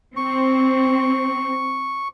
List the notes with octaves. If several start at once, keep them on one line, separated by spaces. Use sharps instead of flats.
C4 C#6